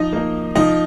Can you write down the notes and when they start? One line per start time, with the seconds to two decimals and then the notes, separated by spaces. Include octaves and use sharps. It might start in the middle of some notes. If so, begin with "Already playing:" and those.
Already playing: F3 D#4 D#5
0.13 A#3 D#4
0.55 F3 D#4 D#5